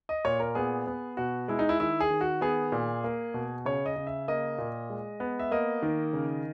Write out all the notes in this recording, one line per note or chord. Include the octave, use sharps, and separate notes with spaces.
D#5
A#2 C#5
A#4
B3 G#4
B3
B2 F#4
G#3 E4
D#4
E4
D#3 E4
G#4
D#3
F#4
B3 G#4
A#2
A#3
B2
C#3 C#5
D#5
C#3
E5
A#3 D#5
A#2
G#3
B3
E5
A#3 D#5
D#3
C#3